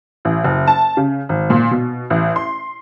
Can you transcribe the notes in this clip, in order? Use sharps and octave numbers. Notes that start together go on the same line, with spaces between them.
A1
F#1
A5
C#3
G#1
A#2
B2
A1
C6